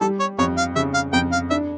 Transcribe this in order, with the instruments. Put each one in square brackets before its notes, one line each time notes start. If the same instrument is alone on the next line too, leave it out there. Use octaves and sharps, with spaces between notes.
[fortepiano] G3 [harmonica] A4
[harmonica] C#5
[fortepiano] F2 [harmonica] C#5
[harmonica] F5
[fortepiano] C#3 [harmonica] E5
[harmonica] F5
[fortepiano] F2 [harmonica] G5
[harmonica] F5
[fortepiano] D4 [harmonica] E5